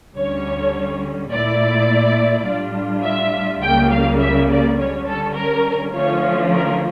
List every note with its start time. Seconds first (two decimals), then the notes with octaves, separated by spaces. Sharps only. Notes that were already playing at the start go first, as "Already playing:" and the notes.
0.16 D2 D3 G3 C#4 C#5
1.31 A#2 A3 E4 D5
2.46 A2 G3 D4 F4
3.04 E5
3.62 C#2 C#3 G3 A#3 G5
3.91 F5
4.19 E5
4.49 D5
4.77 D3 G3 C#4 C#5
5.06 A4
5.34 A#4
5.93 D3 F3 A3 C#4 F4 C#5
6.50 A#4